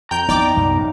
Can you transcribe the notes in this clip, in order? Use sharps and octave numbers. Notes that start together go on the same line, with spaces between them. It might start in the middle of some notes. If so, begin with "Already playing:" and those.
F2 G5 A#5 G6
F2 E3 B3 D#4 D5 G5 D6
C2 F#2 B3
A1 A2